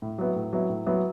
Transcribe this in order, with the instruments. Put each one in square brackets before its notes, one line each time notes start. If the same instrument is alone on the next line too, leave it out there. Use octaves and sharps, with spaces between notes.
[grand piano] A2
F#3 B3 E4
A2
F#3 B3 E4
A2
F#3 B3 E4